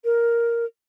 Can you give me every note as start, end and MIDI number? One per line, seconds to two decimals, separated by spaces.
0.05 0.65 70